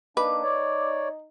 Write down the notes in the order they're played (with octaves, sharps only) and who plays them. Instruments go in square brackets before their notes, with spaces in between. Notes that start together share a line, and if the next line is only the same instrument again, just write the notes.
[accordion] A#3 D4 [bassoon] D#4 [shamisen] B4 [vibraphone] D6
[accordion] C#5 D5